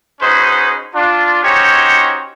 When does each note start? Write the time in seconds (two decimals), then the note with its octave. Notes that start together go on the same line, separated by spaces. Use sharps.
0.21 C#4 D#4 F#4 G#4 B4 C5
0.95 D4 F4
1.43 C#4 D#4 F#4 G4 C5 C#5